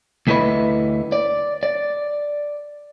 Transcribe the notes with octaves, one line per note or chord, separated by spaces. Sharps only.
D2 A3 E4 B4 D#5 B5
D5
D5